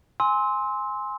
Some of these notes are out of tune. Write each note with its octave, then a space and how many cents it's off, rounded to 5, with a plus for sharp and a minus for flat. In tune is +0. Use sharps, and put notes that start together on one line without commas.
G#5 +0 C6 +5 E6 -30